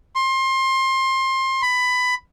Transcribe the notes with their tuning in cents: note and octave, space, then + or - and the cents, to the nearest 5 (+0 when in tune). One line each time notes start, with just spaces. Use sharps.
C6 +25
B5 +15